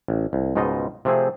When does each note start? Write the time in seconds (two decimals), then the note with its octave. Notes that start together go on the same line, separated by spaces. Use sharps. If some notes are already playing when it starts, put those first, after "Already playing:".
0.08 A1
0.33 C2
0.55 C#2 G#2 B2 D#4 F4 D#5
1.05 C3 F3 A3 C4 G#4